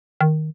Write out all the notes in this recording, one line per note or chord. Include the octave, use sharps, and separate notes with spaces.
D#3